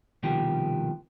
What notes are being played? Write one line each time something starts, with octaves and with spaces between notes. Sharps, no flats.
C2 B2 D#3 F3 G4